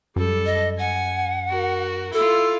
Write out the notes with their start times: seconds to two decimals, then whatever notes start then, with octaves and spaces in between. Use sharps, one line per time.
0.16 F#2 G3 A4
0.46 D#5
0.79 F#5 G#5
1.49 F#4 A#4
2.13 E4 F4 A4